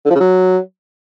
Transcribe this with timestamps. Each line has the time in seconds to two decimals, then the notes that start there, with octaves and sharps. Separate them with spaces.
0.05 D3
0.10 F3
0.15 C#3
0.20 F#3